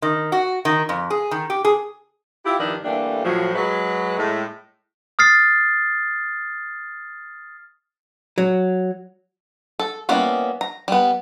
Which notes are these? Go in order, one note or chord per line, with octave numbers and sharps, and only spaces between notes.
D#3
F#4
D#3
F2
G#4
D#3
G4
G#4
E4 F4 G4
G2 D#3 F3 D4 E4
D3 E3 G3 A3 A#3 D4
A2 F3 F#3
F#3 G#3 B4
A2 G#3
D#6 F6 A6 C7
F#3
A4
G3 A#3 B3 C#4 E4
A#5
G3 B3